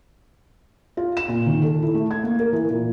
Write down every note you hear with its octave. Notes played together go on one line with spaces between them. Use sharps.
F4
E7
A#2
D#3
A4
E4
A3
G#6
A#3
A#4
E3
A#2